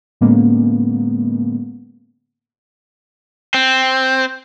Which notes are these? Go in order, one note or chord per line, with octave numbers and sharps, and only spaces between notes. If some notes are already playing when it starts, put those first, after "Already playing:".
A2 D3 G#3 A#3 B3 C#4
C4